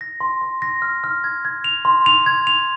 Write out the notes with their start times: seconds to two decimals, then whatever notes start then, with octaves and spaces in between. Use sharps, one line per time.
0.01 A#6
0.21 C6
0.42 C6
0.62 A#6
0.82 F6
1.04 F6
1.24 G#6
1.45 G#6
1.64 F7
1.85 C6
2.06 F7
2.26 G#6
2.47 F7